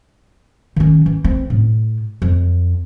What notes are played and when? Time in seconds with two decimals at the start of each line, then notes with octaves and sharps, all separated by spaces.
0.76 D#3 C#4
1.06 E3
1.24 C4
1.50 A2
2.22 F2